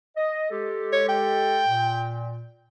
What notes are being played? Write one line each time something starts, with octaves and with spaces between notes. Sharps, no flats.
D#5
G#3 G4 A4
C#5
G5
A#2